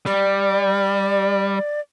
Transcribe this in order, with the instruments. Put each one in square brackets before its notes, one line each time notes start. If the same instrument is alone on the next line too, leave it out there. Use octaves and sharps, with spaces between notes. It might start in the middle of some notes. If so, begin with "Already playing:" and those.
[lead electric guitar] G3 [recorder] D5